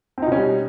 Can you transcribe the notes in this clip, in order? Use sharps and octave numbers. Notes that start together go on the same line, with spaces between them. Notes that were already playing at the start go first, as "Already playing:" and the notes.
B2 G3 C4 C#4 D#4